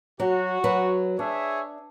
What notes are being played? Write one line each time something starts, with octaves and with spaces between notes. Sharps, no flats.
F#3 F#4
F#3 B4
D4 G#4 C#5 E5